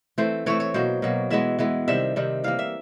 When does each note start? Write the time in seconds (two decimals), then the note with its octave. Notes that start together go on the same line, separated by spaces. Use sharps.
0.18 E3 A3 C4 C5
0.46 E3 A3 C4 C#5
0.60 C#5
0.74 B2 F#3 A#3 C5
1.02 B2 F#3 A#3
1.30 E3 G#3 B3 E5
1.59 E3 G#3 B3
1.88 C3 D#3 G3 C4 E5
2.16 C3 D#3 G3 C4
2.44 E3 G3 A#3 F5
2.59 E5